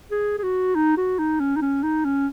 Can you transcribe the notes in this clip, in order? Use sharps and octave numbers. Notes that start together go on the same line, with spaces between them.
G#4
G#4
F#4
D#4
F#4
D#4
C#4
D#4
C#4
D#4
C#4